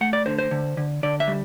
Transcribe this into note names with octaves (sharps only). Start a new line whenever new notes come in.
A3 F#5
D5
D3 C5
C5
D3
D3
D3 D5
E5
G3